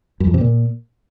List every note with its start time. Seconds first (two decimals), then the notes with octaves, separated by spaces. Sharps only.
0.20 F#2
0.27 F2
0.34 C3
0.41 A#2